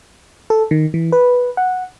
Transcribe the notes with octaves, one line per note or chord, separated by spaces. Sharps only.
A4
D#3
E3
B4
F#5